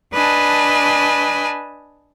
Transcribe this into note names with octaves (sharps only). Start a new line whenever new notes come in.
D4 B4 D#5 G#5 A5